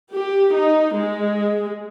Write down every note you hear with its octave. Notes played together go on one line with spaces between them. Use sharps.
G4
D#4
G#3